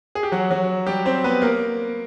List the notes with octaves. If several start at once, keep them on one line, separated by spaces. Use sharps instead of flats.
G#4
G4
F#3 F#4
F#3 F#4
G3 G4
C4 C5
B3 B4
A#3 A#4